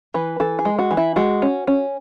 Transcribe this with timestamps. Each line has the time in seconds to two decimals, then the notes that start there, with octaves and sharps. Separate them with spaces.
0.14 E3 B4
0.40 E3 A4
0.59 G#4
0.65 G#3
0.79 F#4
0.91 E3
0.97 E4
1.16 G#3 F#4
1.42 C#4
1.67 C#4